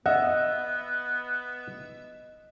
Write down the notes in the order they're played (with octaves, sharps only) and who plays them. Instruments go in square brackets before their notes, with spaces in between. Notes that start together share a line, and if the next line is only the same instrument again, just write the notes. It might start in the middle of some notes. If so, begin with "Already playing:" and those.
[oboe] B3 [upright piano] D#5 [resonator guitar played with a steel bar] E5 [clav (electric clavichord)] F#5